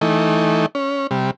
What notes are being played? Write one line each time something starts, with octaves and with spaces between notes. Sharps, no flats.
E3 A3 D#4
C#4
C3 G3